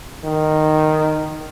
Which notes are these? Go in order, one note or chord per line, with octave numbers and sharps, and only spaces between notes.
D#3